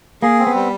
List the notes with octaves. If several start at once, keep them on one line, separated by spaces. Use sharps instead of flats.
A#3 G#4
C4
B3
G3